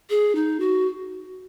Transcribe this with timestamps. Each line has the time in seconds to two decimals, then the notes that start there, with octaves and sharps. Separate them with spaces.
0.10 G#4
0.35 D#4
0.60 F#4